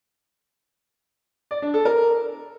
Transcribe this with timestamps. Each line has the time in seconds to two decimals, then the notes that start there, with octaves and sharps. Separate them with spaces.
1.51 D5
1.62 D4
1.74 A4
1.85 A#4